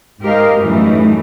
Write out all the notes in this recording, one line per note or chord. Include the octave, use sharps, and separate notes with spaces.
G#2 G#3 G4 A#4 D#5 F5
F#2 A2 E3 G3 A3 D#4